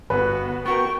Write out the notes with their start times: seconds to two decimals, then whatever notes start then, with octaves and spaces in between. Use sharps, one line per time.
0.10 G1 B3 F#4 B4
0.66 B3 F#4 A#4 G5 C#6